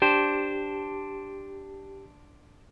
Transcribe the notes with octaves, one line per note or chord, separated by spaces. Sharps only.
D4 G4 C5